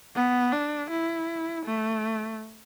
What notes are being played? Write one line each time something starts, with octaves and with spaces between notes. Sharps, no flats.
B3
D4
E4
A3